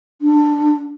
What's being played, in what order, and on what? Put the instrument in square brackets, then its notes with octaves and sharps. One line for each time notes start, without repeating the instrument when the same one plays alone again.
[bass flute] D4